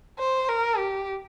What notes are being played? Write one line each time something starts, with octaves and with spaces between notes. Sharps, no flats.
C5
A#4
G4